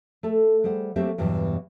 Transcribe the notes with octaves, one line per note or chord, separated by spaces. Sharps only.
A3 A4
G3 G#4 C5 F#5
F#3 A3 A#3 C4 G4 E5
E2 G2 B2 E3 F#3